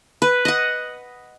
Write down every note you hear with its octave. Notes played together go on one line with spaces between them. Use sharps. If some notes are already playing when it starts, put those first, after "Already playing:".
B4
D#5 F#5